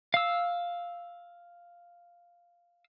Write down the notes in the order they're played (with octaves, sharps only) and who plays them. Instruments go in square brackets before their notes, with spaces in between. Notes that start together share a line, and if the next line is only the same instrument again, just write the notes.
[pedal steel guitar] F5 E6